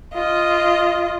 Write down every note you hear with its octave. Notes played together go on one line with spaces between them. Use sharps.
F4 D#5